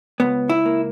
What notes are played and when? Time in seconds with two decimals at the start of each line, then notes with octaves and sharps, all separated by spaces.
0.20 C#2 B3
0.49 E4
0.66 A#3